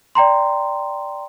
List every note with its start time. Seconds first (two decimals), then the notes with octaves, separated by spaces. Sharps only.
0.15 D5 G5 A#5 C6